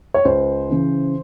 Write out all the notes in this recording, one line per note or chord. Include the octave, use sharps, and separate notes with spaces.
C#5
C#2 C5
C#3 E3